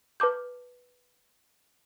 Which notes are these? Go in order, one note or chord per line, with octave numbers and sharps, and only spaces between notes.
B4 A5 D6 G6